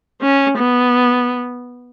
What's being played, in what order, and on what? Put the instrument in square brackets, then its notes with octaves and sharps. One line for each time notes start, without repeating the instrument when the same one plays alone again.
[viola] C#4
B3